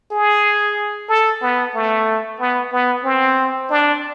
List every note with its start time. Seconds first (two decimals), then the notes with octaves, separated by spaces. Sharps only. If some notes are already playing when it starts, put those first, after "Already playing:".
0.11 G#4
1.09 A4
1.42 B3
1.75 A3
2.39 B3
2.72 B3
3.04 C4
3.70 D4